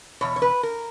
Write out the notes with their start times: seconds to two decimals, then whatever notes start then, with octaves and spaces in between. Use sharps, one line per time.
0.21 E2 B2 C#5
0.36 C#5
0.42 B4
0.63 A#4